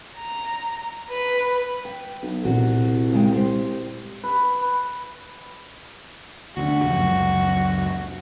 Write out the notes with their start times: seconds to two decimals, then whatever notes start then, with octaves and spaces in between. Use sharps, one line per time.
0.17 A#5
1.10 B4
1.85 G5
2.22 B1
2.45 C2 A#2 F#4
3.12 C#3 G#3 G5
3.32 G4 C5
4.24 B4
6.57 D2 C#4 D4 F#4
6.83 D#2 C#3 F3
6.95 C#2 F#2